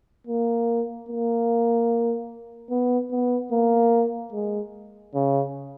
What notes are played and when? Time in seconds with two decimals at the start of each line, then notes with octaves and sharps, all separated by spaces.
0.27 A#3
1.09 A#3
2.70 B3
3.11 B3
3.52 A#3
4.33 G#3
5.14 C#3